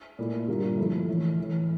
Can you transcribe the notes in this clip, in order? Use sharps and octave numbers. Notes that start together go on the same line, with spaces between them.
A#2 A3 E4
G2 D3 G3 A#3 F4
F3 A3 E4 A4
A2 E3 A3 E4
A2 E3 A3